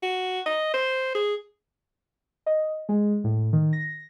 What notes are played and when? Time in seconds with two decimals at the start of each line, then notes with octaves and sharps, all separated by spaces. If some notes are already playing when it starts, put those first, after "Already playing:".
0.03 F#4
0.46 D#5
0.74 C5
1.15 G#4
2.46 D#5
2.89 G#3
3.24 A2
3.53 D#3
3.73 A#6